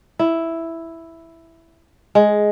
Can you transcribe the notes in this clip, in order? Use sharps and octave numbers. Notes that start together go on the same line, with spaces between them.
E4
G#3